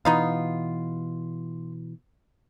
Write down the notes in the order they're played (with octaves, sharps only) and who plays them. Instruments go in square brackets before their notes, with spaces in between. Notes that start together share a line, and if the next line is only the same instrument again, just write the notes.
[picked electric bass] B2 E3 [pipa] B3 D#4 F4